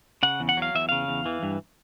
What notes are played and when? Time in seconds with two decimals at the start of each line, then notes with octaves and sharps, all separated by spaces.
0.23 C#3 F#5
0.40 E2
0.49 F#5
0.57 F#3 F5
0.75 E2 E5
0.89 C#3 F5
1.08 E2
1.26 E3
1.43 G2